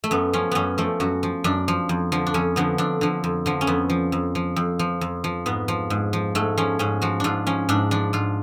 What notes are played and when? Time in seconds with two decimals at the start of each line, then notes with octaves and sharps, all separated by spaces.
0.04 A3
0.11 F#2 B3
0.33 F3 C#4
0.51 F#2 B3 C#4
0.78 F3 A3
1.00 F#2 F#4
1.23 F3
1.44 F#2 D4
1.68 F3
1.89 F2
2.12 D3 F3
2.27 D4
2.34 F2 C#4
2.56 D3 F3 B3
2.78 F2 D4
3.01 D3 F3
3.24 F2
3.46 D3 F3
3.61 C#4
3.67 F2 B3
3.90 F3
4.12 F2
4.35 F3
4.56 F2
4.79 F3
5.01 F2
5.24 F3
5.46 G#2 B3
5.68 F3
5.90 G#2
6.13 F3
6.35 G#2 A3
6.57 F3 C#4
6.79 G#2 C#4
7.02 F3 F#4
7.20 G#2 D4 F4
7.47 F3 C#4
7.69 G#2 D4
7.91 F3 D4
8.13 G#2 F4